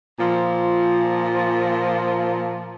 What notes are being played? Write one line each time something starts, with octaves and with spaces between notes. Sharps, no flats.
A#2 F3